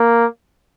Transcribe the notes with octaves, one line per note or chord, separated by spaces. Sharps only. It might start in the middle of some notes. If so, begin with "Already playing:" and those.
Already playing: A#3